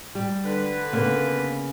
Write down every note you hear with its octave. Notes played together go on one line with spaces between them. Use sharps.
G3
D3 B4
C#3 A#3 B3